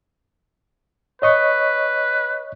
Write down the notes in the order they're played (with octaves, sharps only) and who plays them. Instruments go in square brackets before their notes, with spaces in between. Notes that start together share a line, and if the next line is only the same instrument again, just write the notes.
[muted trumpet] B4 [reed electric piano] C#5 D#5 C#6